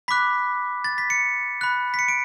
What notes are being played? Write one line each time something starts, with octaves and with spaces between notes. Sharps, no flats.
B5 D6 F#6 B6
A6
B6
C#7
B5 F#6
B6
C#7
D7